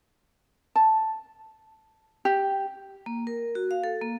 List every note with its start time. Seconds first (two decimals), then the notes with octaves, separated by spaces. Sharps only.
0.76 A5
2.25 G4
3.06 A#3
3.27 A#4
3.55 F#4
3.71 F5
3.84 A4
4.02 A#3